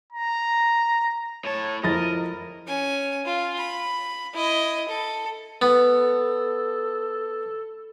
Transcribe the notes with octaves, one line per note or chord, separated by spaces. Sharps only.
A#5
A2 C#5 A5
F2 F3 E4 A#4 D#5 B5 A6
C#4 G#5
F4
B5
E4 D#5
A4
B3 A4